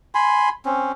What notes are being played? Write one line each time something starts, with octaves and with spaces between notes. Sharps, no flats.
G#5 B5 C6
C4 C#4